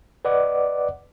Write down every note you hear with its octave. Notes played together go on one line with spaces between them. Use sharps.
B4 D5 D#5 F#5 D6